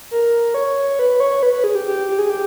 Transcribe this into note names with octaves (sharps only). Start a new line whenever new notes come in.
A#4
C#5
B4
C#5
B4
B4
G#4
G4
G4
G4
G#4
G4